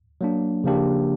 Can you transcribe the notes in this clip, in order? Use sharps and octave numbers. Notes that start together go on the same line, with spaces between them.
F#3 A#3 D4
C#3 F3 A#3 D4 G4